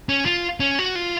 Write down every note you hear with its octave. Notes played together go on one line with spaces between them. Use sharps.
C#4
F4
C#4
F#4
F4